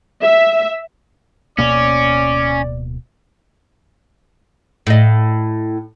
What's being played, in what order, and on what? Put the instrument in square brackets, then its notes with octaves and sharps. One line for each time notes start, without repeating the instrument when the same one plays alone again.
[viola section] E5
[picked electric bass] D1 B2 A#3 [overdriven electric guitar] C#4 [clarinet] D5 [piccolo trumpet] D6
[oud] A2 D#5